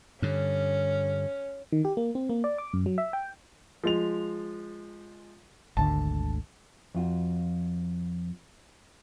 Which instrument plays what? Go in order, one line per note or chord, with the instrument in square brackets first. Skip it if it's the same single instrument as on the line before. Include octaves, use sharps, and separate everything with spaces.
[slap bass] G2 D3 [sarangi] C#4
[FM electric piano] D#3
G4
A#3
C4
A#3
D5
D6
F#2
F#3
E5
G5
[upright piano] F3 G#3 F7
[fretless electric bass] G#1 D2 D3 [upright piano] A5
[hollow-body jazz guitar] F2 F4 F#4